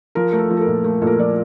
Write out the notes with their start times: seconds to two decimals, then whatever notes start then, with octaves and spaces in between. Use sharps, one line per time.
0.15 F3 A#4
0.32 A3 A#4
0.39 A4
0.50 F3
0.57 A4
0.61 A#4
0.67 A#2
0.84 A3 A#4
1.02 A#2 A4
1.07 A#4
1.18 F3 D5